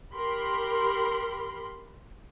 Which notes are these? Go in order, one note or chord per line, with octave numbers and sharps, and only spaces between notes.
G4 A#4 B5 C6